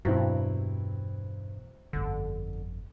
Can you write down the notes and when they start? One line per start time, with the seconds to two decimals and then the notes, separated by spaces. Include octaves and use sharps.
0.05 E2 G2 B2 F#3 C4 E4
1.93 G1 F2 D3